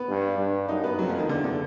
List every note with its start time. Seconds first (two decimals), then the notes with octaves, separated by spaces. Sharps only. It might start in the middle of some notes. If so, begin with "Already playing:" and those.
Already playing: B3
0.08 G2
0.38 G2
0.69 F#2 D#4
0.84 B3
0.99 F2 F#3
1.09 F3
1.19 D#3
1.29 E2 D3
1.44 D3